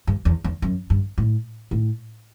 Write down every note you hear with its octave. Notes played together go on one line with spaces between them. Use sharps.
G2
E2
E2
F#2
G2
A2
A2